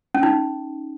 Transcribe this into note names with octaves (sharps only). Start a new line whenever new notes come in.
C#4
D#4